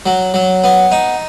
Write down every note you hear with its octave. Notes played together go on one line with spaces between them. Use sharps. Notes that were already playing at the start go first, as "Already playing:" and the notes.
F#3
F#3
B3
D#4